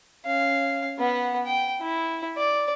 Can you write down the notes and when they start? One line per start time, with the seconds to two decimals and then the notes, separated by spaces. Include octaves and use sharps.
0.25 C#4 F5
0.98 B3 F#5
1.45 G5
1.80 E4
2.37 D5